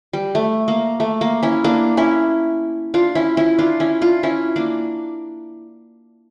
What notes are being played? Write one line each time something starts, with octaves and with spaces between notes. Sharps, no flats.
G3
A3
A#3
A3
A#3
C#4 E4
A#3 D4
C#4 E4
D4 F4
C#4 E4
C#4 E4
D4 F4
C#4 E4
D4 F4
C#4 E4
A#3 D4